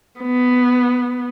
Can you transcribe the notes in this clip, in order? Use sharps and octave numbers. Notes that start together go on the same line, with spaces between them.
B3